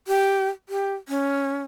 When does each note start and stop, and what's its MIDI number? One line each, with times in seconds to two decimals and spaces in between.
0.08 0.49 67
0.69 0.94 67
1.08 1.63 61